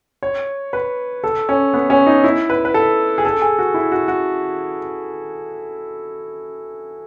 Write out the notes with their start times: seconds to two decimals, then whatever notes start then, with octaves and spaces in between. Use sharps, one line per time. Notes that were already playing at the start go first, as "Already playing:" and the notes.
0.23 C#5
0.73 B4
1.24 A4
1.49 C#4
1.74 B3
1.90 C#4
2.07 D#4
2.24 E4
2.50 B4
2.65 B4
2.74 A4
3.18 G#4
3.25 A4
3.42 G#4
3.59 F#4
3.74 E4
3.92 F#4
4.08 F#4